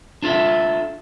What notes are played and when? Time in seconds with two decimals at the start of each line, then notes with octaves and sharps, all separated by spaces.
0.22 D4 F4 A4 E5